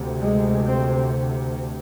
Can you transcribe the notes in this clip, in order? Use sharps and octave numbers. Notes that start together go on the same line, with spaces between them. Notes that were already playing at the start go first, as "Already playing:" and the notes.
Already playing: D2 C3
G#3
C4